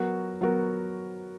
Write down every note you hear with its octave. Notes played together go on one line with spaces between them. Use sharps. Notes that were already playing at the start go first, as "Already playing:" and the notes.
Already playing: F#3 B3 F#4 A#4
F#3 B3 F#4 A#4